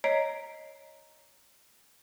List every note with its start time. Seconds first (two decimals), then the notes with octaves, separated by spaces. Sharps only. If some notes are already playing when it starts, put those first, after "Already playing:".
0.04 C#5 D#5 A#5 B6 C7 D7